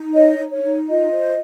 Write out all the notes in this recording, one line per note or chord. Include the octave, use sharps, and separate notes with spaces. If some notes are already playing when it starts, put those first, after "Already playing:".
Already playing: D#4
C#5 D#5
D#4
C#5
D#4
F4 D#5
C5